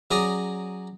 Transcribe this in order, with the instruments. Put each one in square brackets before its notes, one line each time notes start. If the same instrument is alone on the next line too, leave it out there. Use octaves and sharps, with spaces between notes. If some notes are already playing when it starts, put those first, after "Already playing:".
[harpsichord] F#3 C#4 G#4 D5 A#5 D#6